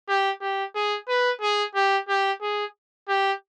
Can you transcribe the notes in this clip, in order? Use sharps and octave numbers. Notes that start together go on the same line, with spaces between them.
G4
G4
G#4
B4
G#4
G4
G4
G#4
G4